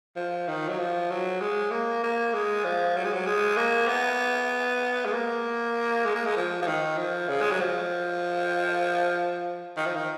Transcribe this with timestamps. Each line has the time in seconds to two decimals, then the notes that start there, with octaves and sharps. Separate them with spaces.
0.16 F3
0.48 D#3
0.68 F#3
0.79 F3
1.10 F#3
1.40 G#3
1.71 A#3
2.03 A#3
2.34 G#3
2.64 F3
2.96 F#3
3.05 G#3
3.13 F#3
3.26 G#3
3.57 A#3
3.88 B3
5.06 G#3
5.12 A#3
6.05 G#3
6.15 A#3
6.26 G#3
6.37 F3
6.62 F3
6.68 D#3
6.98 F3
7.29 C#3
7.41 G#3
7.51 F#3
7.60 F3
9.77 D#3
9.86 F3
9.96 D#3